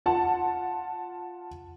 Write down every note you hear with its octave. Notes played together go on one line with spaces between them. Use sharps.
F4 F#5 A5